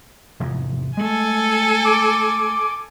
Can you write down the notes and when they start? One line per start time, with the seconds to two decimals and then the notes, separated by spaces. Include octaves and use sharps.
0.40 F1 E2 G#2
0.97 G#3 A3 A4 G#5
1.85 D6